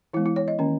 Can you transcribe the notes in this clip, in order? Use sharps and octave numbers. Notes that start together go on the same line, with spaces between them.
E3 G#3 B3 E4
E4
C#5
D#5
D#3 A#3 C#4